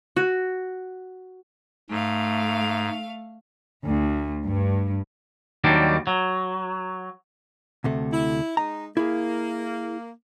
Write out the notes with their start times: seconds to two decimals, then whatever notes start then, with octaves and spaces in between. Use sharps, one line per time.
0.16 F#4
1.90 G#2 A3 F5
3.86 D2
4.46 G2
5.64 D#2 D#3 F#3 G3 D4
6.07 F#3
7.84 D2 C3 A3
8.13 E4
8.57 G#3 D#4 A#5
8.97 A#3 E4 G#4